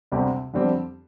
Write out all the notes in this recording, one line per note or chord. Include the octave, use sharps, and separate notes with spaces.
D2 C3 G3 C4 G4
F2 D3 G3 C4 G4